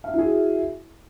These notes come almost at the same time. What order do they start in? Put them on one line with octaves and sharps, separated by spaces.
F5 E5 E4 G#4 F#4